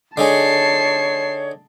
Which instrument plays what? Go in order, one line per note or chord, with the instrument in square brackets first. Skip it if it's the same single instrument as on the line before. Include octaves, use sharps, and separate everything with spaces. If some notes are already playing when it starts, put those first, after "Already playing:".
[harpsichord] D3 D#4 G#4 [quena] C#5 [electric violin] A5 C7